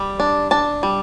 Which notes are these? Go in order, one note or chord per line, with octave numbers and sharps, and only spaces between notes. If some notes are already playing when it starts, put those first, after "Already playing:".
Already playing: G3
D4
D4 A5
G3